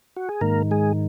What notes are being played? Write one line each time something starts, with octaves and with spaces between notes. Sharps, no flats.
F#4
G#4
G#2 D#3 A#3 A#4
G#3 G#4